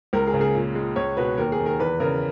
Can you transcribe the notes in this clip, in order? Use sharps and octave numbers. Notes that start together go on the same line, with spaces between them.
C#2 A#4
G#4
C#3
G#4
A#2
G#3
C#2 C#5
B2 B4
D#2 A#4
G#4
D#3
A#4
E2 B4
C#3 A#4